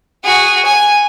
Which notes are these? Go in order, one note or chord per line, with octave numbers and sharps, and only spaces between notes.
F#4 G#4
G#5